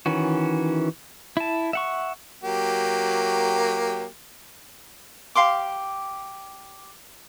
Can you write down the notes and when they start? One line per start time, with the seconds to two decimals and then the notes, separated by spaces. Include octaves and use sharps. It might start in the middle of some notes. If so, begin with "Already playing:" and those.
0.06 D#3 E3 C#4 F#4
1.37 E4 A5
1.73 E5 F#5 C#6
2.43 F#3 A#3 G4
5.35 G4 F5 C6 D6